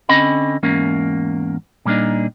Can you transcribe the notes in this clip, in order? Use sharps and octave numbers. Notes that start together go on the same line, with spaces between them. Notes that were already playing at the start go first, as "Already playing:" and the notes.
D3 C4 C#4 D#5 B5
E2 G#2 A#3 C#4
A#2 G3 A#3 D4 D#4